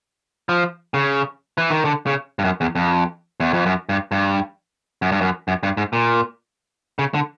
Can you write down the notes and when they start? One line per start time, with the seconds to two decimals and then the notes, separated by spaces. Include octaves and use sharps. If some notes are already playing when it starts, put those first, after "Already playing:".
0.49 F3
0.94 C#3
1.58 E3
1.71 D#3
1.85 D3
2.07 C#3
2.39 G2
2.44 F#2
2.61 E2
2.75 F2
3.40 E2
3.53 F2
3.66 F#2
3.89 G2
4.12 G2
5.02 F#2
5.12 G2
5.21 F#2
5.48 F#2
5.63 G2
5.77 G#2
5.93 A#2
6.99 C#3
7.14 D3